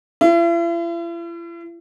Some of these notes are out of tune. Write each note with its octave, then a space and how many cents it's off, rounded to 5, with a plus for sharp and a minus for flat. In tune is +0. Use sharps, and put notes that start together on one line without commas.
E4 +45